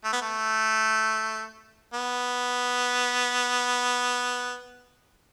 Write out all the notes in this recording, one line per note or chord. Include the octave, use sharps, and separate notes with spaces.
A3
B3
A3
B3